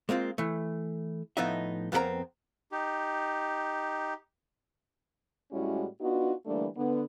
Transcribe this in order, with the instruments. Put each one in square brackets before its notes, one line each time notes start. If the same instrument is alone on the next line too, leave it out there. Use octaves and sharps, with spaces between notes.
[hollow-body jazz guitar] G#3 A#3 C4 F4
E3 A3
A2 F3 B3 D#4 D#5 E5
F2 B3 C4 A4 A#4 A#5
[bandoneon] D#4 G4
[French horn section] A2 G3 G#3 C#4 E4 F#4
B3 D4 D#4 F4 F#4
D3 E3 G3 A3 A#3 D4
D3 B3